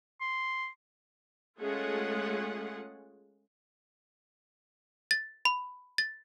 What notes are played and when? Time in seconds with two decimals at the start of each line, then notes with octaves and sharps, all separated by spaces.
0.21 C6
1.60 G#3 A3 C#4 F4 G#4 F#5
5.11 A6
5.45 B5
5.98 A6